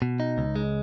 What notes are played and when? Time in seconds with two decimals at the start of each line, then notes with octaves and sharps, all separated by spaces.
0.02 B2
0.20 D#4
0.38 C#2
0.56 G#3